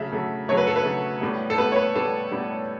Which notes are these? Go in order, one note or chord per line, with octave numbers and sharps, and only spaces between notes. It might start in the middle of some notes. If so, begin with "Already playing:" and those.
Already playing: C#3 F#3 A3 E5
C#3 F#3 A3
C#3 F#3 A3 C#5
B4
A4
B4
C#3 F#3 A3
A2 G3 B3
A4
A2 G3 B3 B4
C#5
B4
A2 G3 B3 A4
A2 G3 B3